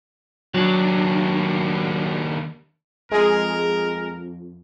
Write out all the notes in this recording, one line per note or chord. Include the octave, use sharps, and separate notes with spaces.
D#2 F#3 D4
F2 G#3 G#4 A#4